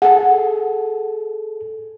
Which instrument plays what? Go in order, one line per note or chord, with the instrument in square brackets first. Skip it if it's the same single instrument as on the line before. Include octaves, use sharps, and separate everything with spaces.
[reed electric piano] G#4 A4 [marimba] F#5